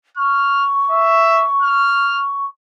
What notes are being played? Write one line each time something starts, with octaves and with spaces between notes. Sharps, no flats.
C#6 F6
E5
F6